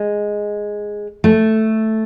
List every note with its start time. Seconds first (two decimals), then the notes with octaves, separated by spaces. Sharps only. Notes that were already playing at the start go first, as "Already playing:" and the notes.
Already playing: G#3
1.24 A3